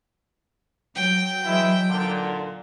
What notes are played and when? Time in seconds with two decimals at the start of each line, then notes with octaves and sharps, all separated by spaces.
0.96 F#3 G5
1.45 E3 G#3 E4
1.87 B1 A#2 D3